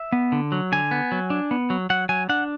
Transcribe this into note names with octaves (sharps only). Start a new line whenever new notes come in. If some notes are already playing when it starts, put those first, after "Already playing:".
Already playing: E5
B3
D3
F#3
D3 G#5
B3
F#3
D4
B3
F#3
F#3 F#5
F#3 G#5
D4 F#5